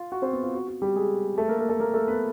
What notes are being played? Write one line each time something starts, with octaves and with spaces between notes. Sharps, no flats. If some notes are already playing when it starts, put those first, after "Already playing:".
Already playing: F4 F5
F#4 F#5
C4 C5
B3 B4
F4
F#4
F#4
G3 G4
G#3 G#4
A3 A4
A#3 A#4
A#3 A#4
A3 A4
A#3 A#4
A3 A4
B3 B4